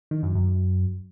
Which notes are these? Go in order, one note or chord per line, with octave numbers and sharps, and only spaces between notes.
D#3
F#2
F#2